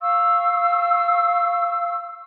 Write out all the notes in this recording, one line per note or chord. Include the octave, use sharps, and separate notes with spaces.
F5 C#6 E6